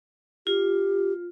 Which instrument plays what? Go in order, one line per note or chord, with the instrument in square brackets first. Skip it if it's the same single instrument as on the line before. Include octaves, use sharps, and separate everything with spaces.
[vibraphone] F4 [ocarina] G4